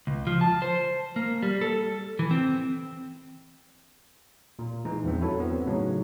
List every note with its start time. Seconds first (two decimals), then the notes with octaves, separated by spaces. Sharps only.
0.07 C#2
0.27 F3
0.41 A5
0.62 C5
1.16 A#3
1.43 G3
1.61 A4
2.19 E3
2.31 C4
4.59 A#2
4.85 E3 G#3 D#4
5.04 E2 G2 F3 C4
5.21 E4 F#4 A4 C#5
5.40 B3 C4
5.66 A2 C#3 F#3 D#4